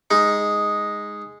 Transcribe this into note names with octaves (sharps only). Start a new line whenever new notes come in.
G#3 D#4